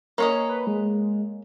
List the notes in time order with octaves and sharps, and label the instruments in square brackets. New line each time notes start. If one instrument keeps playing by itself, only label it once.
[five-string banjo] A#3 C#4 D#5 [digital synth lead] C#5
[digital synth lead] B4
G#3